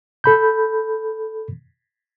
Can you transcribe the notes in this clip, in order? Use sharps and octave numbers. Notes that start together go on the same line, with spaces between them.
A4 B5 G6